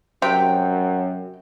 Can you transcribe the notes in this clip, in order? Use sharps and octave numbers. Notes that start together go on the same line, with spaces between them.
F#2 C3 G5